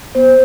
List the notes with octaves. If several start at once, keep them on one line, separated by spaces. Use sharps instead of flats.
B3 C5